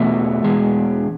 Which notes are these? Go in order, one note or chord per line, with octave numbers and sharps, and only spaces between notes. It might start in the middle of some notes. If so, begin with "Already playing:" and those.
Already playing: E2 B2 A3 E5
E2 B2 G#3